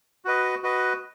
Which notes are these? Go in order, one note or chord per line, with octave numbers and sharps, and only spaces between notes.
F#4 B4 D#5
F#4 B4 D#5